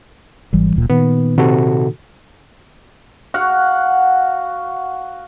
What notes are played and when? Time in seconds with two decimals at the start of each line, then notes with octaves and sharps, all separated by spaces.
0.53 G#1 E3 G3
0.76 D1 A#2
0.90 A#2 D#3 B3
1.38 C3 F#4 A4
3.34 F#4 F5 F#5